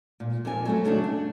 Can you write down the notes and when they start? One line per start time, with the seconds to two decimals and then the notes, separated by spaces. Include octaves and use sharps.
0.20 A#2
0.45 F2 A#2 A#4 G#5
0.65 F#3 A3 B3
0.84 F#2 C#3 A3 D4 D#4 F#4
1.04 D4